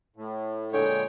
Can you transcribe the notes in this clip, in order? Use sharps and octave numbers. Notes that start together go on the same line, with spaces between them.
A2
A#2 D3 G#3 C#5 G5